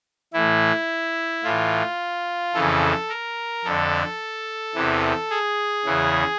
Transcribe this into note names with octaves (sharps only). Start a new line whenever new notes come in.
A2 E3 E4
A2 E3 F4
F2 C#3 E3 A4
A#4
F2 D3 A4
E2 C3 E3
G#4
E2 C#3 E3